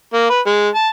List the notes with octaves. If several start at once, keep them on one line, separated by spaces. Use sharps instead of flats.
A#3
B4
G#3
A5